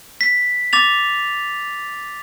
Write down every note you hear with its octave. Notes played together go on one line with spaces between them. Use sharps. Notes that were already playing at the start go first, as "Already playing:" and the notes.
B6
D6 A6 F7